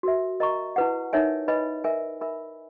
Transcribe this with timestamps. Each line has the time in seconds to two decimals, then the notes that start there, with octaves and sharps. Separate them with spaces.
0.03 F#4 A#4 E5
0.40 A#4 D#5 A#5 C#6
0.76 E4 B4 F#5
1.13 D#4 A#4 C#5 E5 G#5
1.48 B4 D#5 G#5 B5
1.84 A#4 E5 G#5
2.21 A#4 E5 G#5 B5